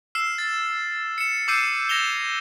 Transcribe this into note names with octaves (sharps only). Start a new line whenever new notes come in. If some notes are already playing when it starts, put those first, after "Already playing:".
E6 F6 C7 E7
A6
C#7 E7
D6 E6 G6 C7 C#7 D#7
G#6 A#6 E7 F7 G7